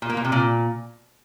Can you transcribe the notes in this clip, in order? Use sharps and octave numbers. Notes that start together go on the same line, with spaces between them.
A#2
A#3
A#2
C3
A#2